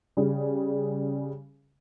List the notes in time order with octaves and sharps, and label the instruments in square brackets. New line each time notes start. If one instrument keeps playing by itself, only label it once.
[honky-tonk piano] C#3 G3 G#4